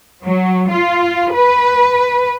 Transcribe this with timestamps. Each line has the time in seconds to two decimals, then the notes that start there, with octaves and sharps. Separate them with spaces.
0.24 F#3
0.70 F4
1.34 B4